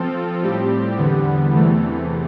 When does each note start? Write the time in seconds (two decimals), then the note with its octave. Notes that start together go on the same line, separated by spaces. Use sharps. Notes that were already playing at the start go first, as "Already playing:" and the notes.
Already playing: F3 C4 F4 A4
0.42 A2 G3 C4 G4
0.96 E2 D3 G3 B3
1.52 E2 C3 E3 A3